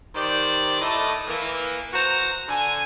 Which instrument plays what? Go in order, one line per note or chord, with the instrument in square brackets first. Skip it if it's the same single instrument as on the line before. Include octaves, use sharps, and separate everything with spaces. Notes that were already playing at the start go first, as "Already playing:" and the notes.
[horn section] D#3 G4 C5 D5
A2 A3 D#5 A5
E3 A#3
F#4 C5 A#5
D3 G#5